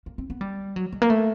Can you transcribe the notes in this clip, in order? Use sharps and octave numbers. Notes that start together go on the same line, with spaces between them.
A#3
C4
B3
G3
F#3
G#3
A#3
A3